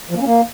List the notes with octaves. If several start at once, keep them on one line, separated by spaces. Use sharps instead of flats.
F3
A#3
C#4
A#3